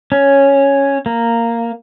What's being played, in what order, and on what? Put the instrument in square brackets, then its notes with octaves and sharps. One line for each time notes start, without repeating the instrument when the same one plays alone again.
[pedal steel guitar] C#4
A#3